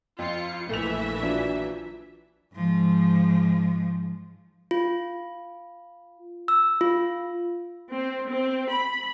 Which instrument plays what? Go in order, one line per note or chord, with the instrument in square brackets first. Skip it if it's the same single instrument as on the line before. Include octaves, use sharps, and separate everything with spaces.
[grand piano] F2 [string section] F4 C#7
[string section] A#1 E3 E5 [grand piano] A3 F7
[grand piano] F3 F#3 D4
[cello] G#2 F3
[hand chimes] F4
E6
F4
[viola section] C4
C4
B5